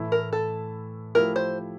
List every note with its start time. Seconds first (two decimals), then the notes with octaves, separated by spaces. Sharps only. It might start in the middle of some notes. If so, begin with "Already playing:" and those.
Already playing: A2 E3 A3 E4
0.12 A#4
0.33 A4
1.15 F3 A3 E4 G4 A#4
1.36 C5